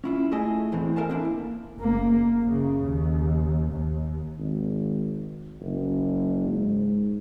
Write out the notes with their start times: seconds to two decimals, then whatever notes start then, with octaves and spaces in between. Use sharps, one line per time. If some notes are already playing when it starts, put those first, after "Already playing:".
0.04 C#4 E4 F4
0.31 A3 E4 G#4 D#5
0.72 E2 A2 E3 C4
0.96 A4 A#4 D#5 F5 G#5 A5
1.09 C4 D4 E4
1.25 A#3
1.78 F#1 A#3
2.41 F#2 C#3
2.84 D#2
3.72 D#2
4.39 G#1
5.61 F#1
6.47 G#2